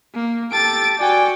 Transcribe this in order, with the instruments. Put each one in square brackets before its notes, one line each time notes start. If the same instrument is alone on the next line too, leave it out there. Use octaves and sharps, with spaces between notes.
[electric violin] A#3
[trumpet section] G4 A4 A5 [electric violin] A6 D7
[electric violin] F#4 G5 [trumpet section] D5 G#5